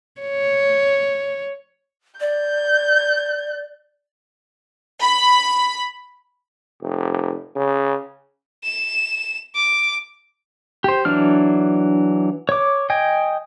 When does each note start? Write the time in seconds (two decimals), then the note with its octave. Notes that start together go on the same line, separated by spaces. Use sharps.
0.21 C#5
2.20 D5 G6
5.01 B5
6.82 F1
7.56 C#3
8.63 E7
9.55 D6
10.84 G4 C5
11.05 E3 F#3 D4 F6
12.49 C#5 D6
12.90 D#5 G5 G#5